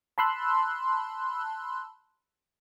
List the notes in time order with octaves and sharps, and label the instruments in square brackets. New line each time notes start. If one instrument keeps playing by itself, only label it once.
[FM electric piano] A5 B5 C6 E6 F#6